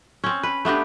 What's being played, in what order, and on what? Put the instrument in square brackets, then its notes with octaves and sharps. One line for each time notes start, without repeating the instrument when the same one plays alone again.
[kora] C4 C#4
B4
A3 B3 D4 G4